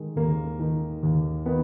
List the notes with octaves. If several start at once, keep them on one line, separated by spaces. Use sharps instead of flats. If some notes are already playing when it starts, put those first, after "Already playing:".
Already playing: D#3 G#3
D#2 A#3
D#3
D#2
D#3 B3